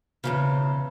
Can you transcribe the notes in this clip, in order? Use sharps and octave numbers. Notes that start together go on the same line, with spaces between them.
E2 A2 C#3